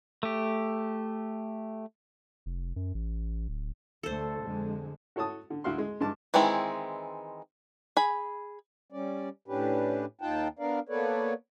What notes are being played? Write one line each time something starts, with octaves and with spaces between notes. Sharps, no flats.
A3 G4
F1
F#2
A1
D1
D2 D3 A3 A4 C5
F2 D3 G#3
F#4 A4 C#5 A5 D#6
D3
D2 E4 F#4 F5 C6
G#3
G2 G#3 A5 D6
D#3 E3 G#3 C4 E4
G#4 B5
G3 C#4 D5
A2 C#4 D4 G4 B4
D#2 D#4 F4 F#5 G5 A5
B3 D4 A#4 D5 F5
A#3 B3 A4 B4 C#5 D5